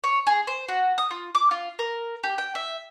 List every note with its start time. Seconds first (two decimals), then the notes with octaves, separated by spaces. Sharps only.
0.04 C#5
0.27 G#4
0.47 C5
0.68 F#4
0.98 D#6
1.11 F4
1.35 D6
1.51 F4
1.79 A#4
2.23 G4
2.38 G5
2.55 E5